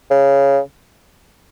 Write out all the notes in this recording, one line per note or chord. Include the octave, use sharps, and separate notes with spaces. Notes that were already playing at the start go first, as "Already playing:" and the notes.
C#3